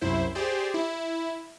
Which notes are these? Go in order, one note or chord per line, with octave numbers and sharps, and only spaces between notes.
C2 F#2 E4 C5
G4 G#4 C5 D5
E4